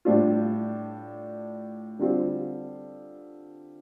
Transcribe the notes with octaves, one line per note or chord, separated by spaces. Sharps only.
A2 G3 D4 F4
D3 G3 C4 F4